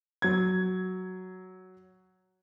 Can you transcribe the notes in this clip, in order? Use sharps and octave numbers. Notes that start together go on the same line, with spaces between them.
F#3 G#6